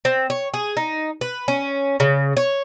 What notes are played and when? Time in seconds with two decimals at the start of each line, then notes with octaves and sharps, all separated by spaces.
0.05 C4
0.30 C#5
0.54 G#4
0.77 D#4
1.21 B4
1.48 C#4
2.00 C#3
2.37 C#5